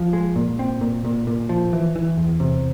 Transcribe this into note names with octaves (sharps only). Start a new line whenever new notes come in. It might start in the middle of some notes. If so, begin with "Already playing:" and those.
Already playing: F3
G#3
A#2
C4
A#2
A#2
A#2
F3
E3
E3
E2
C3